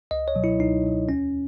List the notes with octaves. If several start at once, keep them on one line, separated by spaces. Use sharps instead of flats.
C#2 D#5
C#5
B2 F#3
E4
C#2 D#4
B2 F#3
D#2 C#4